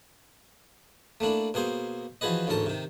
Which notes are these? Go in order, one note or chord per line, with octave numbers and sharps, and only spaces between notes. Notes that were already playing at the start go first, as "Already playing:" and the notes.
A3 A#3 D4 E4
B2 A#3 G#4 C5
E3 F3 F#4 G#4 B4 D#5
A1 D2 G#2 C#4 A#4 A5
C3 D#3